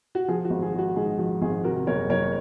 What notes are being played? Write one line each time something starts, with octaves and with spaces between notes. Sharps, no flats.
F#4
F3 G#4
F#4
G#1
G#4
G#3
F#4
G#2 G#4
F3 F#4
G#1 G#4
C3 F#4 A#4
F#1 A#4 C#5
F#1 A#4 C#5